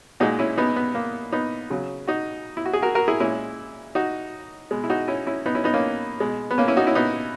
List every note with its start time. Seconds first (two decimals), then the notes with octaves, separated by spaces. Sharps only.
0.20 A#2 G#3 D#4 F#4
0.39 C#4 E4
0.57 B3 D#4
0.76 B3
0.95 A#3
1.32 B3 D#4
1.70 C#3 F#3
2.07 D#4 F#4
2.57 E4
2.66 F#4
2.74 G#4
2.82 F#4 A#4
2.95 F#4 A#4
3.08 E4 G#4
3.20 A#2 G#3 C#4 E4
3.95 D#4 F#4
4.71 B2 G#3
4.84 E4
4.90 D#4 F#4
5.08 C#4 E4
5.27 C#4 E4
5.46 B3 D#4
5.55 C#4 E4
5.64 B3 D#4
5.74 A#3 C#4
6.20 B2 G#3
6.51 B3
6.58 A#3 C#4
6.68 C#4 E4
6.77 D#4 F#4
6.87 C#4 E4
6.95 B3 D#4